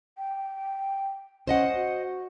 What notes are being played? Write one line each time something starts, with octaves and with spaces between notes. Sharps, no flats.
G5
C#4 C5 D#5 F#5
F#4